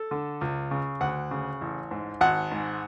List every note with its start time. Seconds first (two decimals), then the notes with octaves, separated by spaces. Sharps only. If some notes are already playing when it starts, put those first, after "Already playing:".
Already playing: A4
0.11 D3
0.41 C#2
0.71 C#3
1.01 D2 F#5
1.31 C#3
1.61 A1
1.91 G#2
2.21 G#1 F#5
2.52 G#2